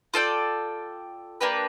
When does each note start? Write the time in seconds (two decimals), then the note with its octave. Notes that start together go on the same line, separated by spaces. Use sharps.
0.14 F4 A4 D5 G5
1.41 A#3 D4 G4 B4